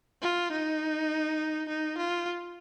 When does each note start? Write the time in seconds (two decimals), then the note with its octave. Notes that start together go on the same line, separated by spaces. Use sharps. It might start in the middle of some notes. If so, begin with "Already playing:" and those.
0.22 F4
0.52 D#4
1.69 D#4
1.98 F4